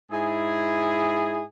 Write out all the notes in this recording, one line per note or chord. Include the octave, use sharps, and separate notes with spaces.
G#2 E4 G#4